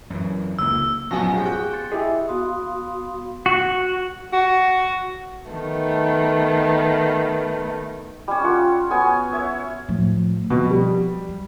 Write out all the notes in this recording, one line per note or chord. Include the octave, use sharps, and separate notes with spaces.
F#2 E3
C#2 A#3 E6
B1 F#2 F3 B3 F5 G#5 C#6 A#6
G#1 G4 G#4 G5
F#4 G5 F#6
C6 A6 C#7
E4 G4 G#4 D#5 E5
B3 F#4 F5 B5 C6 D#6
F#4
F#4
D#3 A3 B3
G3 C#4
F4 F#5 E6
B3 F#4 C#5 G#5
C#5 E5
A2 F3
B2 F3
G3
G3